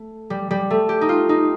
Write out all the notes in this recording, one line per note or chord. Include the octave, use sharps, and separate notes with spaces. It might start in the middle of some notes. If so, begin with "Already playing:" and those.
Already playing: A3
G3
G3
A3
G4
D#4
F4
D#4